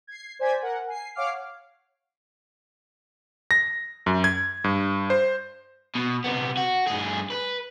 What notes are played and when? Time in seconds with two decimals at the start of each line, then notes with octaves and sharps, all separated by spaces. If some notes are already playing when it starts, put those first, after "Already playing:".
0.07 G#6 C7
0.39 C5 D5 G#5 G#6 B6
0.62 A#4 F#5
0.87 G#5 C7
1.15 C#5 F5 F#5 D6 F6 C7
3.51 A#6
4.06 F#2
4.24 G#6
4.64 G2
5.10 C5
5.95 B2
6.24 C3 B3
6.57 F#4
6.87 G2 G#4
7.30 B4